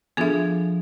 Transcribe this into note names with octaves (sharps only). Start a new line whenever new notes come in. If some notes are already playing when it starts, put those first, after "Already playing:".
F3 B3 D4 F4 G#4 A4 E5